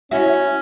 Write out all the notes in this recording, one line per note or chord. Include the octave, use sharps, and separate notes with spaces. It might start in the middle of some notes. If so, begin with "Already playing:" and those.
C#4 E4 F#4